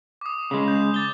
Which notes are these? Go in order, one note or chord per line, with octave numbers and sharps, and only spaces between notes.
D6 D#6
C#3 G#3
G6
D6 A6 G7